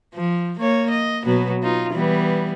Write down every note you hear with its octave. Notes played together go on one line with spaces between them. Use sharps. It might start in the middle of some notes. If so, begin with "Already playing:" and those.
F3
A#3 C#5
D#5
B2 F#3 B3
D#4 F4
E3 G3 B3